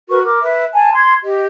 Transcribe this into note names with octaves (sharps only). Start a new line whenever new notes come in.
F#4 A#4 B4 C#6
A#4 D6
B4 E5
G#5 A5
C6 G#6
G4 D#5